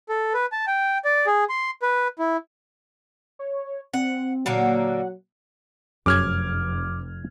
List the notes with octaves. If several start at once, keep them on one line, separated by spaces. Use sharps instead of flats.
A4
B4
A5
G5
D5
G#4
C6
B4
E4
C#5
C4 F#5
A#2 D3 F#3 A#3 F#5
F1 F#2 G#4 C#5 D6 F6 G#6